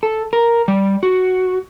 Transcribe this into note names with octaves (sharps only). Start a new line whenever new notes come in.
A4
A#4
G3
F#4